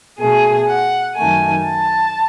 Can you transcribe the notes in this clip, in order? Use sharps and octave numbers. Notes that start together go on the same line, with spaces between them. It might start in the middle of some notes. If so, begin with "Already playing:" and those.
B2 A3 G#4
F#5
F#2 D#3 A3 G#5
A5